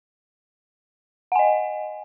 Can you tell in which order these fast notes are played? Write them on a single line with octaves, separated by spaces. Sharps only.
F#5 G#5 D#5